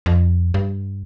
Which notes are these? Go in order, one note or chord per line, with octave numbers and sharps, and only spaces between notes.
F2
G2